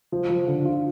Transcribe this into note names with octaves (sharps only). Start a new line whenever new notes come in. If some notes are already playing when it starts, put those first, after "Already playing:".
F3
F3
D3
F4